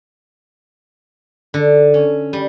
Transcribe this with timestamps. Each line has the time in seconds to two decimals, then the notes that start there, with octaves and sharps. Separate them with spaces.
1.54 D3
1.94 C#4
2.33 G3